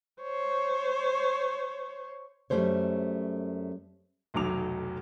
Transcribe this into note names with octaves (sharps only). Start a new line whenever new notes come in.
C5 C#5
F#2 B2 G3 A3 C5 C#5
F1 B1 D#3 F#3 D6 F7